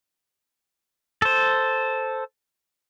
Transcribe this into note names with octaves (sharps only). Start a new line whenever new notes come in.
A4 C5